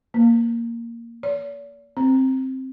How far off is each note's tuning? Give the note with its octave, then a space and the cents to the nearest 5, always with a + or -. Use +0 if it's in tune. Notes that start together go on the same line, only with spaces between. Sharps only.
A#3 -5
D5 -45
C4 +5